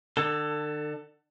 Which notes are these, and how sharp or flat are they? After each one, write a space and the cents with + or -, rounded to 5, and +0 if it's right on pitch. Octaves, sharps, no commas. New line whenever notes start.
D3 +35 A4 +15